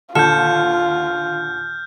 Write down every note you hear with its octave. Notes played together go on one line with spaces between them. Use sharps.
D#2 A#2 D3 F4 A4 F6 G6